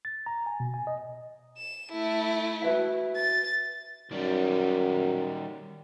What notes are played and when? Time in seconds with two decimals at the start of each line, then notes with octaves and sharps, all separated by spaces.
0.05 A6
0.26 A#5
0.46 G#5
0.60 B2
0.74 G#5
0.87 D#5
1.58 E7
1.92 A3 E4
2.62 F#4 B4 E5
3.16 A6
4.11 F#2 D#3 G3